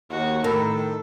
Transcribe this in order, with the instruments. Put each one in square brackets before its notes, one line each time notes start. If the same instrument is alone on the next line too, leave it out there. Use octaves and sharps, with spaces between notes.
[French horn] D#2 [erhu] F#4
[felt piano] A2 B5 [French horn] D#3 [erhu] A4 [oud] A#4